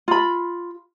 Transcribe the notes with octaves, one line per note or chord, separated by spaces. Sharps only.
F4 B5